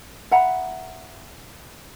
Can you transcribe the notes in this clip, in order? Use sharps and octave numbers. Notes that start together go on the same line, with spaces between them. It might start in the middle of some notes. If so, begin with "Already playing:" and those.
E5 F#5 A#5 B5